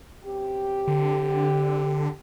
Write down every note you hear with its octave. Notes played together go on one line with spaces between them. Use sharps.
F#2 C3 G4
D3